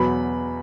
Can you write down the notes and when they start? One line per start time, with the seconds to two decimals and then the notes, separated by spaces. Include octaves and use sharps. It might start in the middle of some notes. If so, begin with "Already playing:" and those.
Already playing: E2 B2 F#3 B5